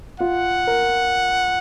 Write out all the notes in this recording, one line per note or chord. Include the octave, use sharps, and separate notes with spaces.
F4 F#5
A#4